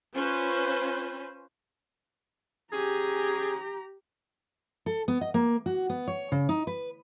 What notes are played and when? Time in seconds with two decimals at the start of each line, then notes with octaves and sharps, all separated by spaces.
0.15 C#4 F4 B4 C5
2.73 C#4 G4 G#4 A#5
4.86 A4
5.08 B3
5.21 D#5
5.34 A#3
5.66 F#4
5.90 B3
6.08 C#5
6.32 C#3
6.49 D#4
6.67 B4